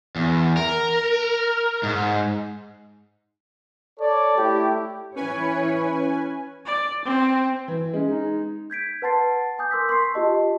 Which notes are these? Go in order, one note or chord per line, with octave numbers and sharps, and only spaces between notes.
E2
A#4
G#2
A4 C#5 D5
A3 E4 G4
E3 C#4 E4 B4 C#5 G#5
D5
C4
E3
G#3 C#4
D#4
G6 G#6 B6 D7
B4 F#5 A5 C6 A6 C7
G#5 D6 D#6 G6
A#4 C6 D6 E6 G6 B6
C6 C#6 E6 B6 C7
F4 G4 D#5 A5